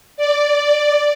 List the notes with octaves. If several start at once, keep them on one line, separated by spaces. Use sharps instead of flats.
D5